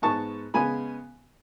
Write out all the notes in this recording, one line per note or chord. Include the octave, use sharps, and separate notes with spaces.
G#2 G#3 B3 A5 C#6
C#3 G#3 B3 G#5 B5